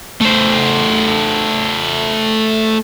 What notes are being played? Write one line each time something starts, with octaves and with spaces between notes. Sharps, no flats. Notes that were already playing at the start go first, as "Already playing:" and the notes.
A3 C5